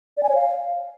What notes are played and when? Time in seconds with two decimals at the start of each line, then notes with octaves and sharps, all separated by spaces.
0.17 D5
0.23 G#5
0.29 C#5
0.35 F5